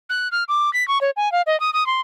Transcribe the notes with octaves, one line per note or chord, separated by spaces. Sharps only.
F#6
F6
D6
B6
C#6
C#5
G#5
F5
D#5
D#6
D#6
C6